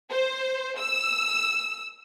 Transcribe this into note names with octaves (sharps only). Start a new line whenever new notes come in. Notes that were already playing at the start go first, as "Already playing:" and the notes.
C5
E6